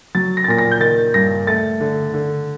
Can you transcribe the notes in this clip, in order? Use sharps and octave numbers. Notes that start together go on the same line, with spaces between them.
F#3 A6
A#6
A6
A#2 A#6
A#6
G6
D#3 A6
G2 A#6
A3 A6
D3
D3